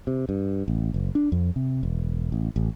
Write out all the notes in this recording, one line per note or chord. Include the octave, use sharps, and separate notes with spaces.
C3
G2
A1
F#1
D4
F2
C3
E1
A1
A1